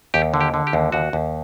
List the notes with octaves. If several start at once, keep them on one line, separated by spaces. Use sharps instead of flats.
D#2 G4
D3
G4
D3
G4
D#2
D#2 F#4
D#2